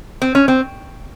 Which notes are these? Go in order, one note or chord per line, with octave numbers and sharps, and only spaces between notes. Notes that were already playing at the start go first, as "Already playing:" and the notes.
C4
C#4
C4